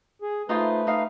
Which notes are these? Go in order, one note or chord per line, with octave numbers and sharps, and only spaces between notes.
G#4
A3 D#4 F4 B4 C5
D#4 F5